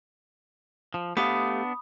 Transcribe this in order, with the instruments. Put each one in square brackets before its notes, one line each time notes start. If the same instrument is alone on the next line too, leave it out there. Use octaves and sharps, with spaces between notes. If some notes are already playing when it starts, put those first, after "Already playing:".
[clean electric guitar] F3
[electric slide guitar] A3 G4 F5 [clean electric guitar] B3 D4 [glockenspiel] B5 D#6